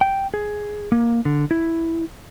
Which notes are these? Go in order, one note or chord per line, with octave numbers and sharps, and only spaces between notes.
G5
G#4
A#3
D3
E4